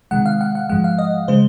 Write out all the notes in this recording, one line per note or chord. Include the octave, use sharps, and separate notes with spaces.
C3 D#3 G#3 F#5
F5
F#5
F#5
G#2 F3 G#3 F#5
F5
D#5
C#3 G#3 C5